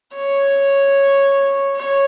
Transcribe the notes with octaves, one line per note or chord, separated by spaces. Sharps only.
C#5
C#5